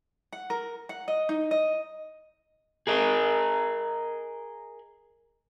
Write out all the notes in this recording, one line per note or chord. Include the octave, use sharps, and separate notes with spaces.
F#5
A#4
F#5
D#5
D#4
D#5
G#4 A#4 D#5